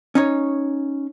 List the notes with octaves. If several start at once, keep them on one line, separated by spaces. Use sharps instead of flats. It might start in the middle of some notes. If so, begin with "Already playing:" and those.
C#4 D#4 C#5